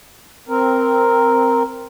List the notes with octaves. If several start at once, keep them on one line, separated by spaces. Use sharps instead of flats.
C4 A#4